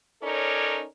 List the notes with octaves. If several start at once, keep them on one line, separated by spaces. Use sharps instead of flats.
C#4 D#4 A4 A#4 C#5 D5